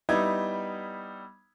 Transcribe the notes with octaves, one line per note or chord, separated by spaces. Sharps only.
G3 B3 D#4 E4 G#6